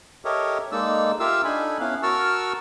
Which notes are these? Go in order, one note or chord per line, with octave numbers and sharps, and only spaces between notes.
G4 A4 A#4 C#5 D#5 E5
G#3 A#3 D#4 A4 D5 E6
F4 G4 A#4 E5 F5 E6
D4 D#4 A4 G#5 B5
B3 C#4 E4 B4 F5
F#4 A#4 A5 C#6 E6 F6